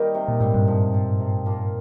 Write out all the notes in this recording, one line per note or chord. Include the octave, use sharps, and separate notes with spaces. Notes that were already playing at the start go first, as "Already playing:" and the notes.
Already playing: D#3 G3 A#3 D#4
C3
A#2
G#2 G3 C4
G2
F3
C4 F4
C3
F3 A#3 F4